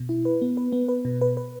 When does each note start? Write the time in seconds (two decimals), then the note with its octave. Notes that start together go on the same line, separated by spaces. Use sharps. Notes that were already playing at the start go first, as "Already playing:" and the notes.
Already playing: B2
0.09 E4
0.25 B4
0.42 B3
0.57 B4
0.73 B3
0.89 B4
1.05 B2
1.21 B4
1.37 B4